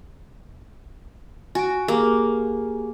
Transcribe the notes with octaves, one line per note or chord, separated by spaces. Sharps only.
F#4 G#5 D7
A#3 G4 G#4 G#5